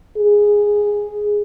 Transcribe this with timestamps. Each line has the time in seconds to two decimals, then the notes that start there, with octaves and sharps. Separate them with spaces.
0.18 G#4